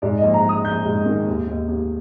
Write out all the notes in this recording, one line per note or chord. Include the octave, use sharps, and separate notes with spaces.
G#2 D5
D#5
A#1
A#5
A#1
D#6
A#1 G6
G#2
D#3
D#2
D#2
D#2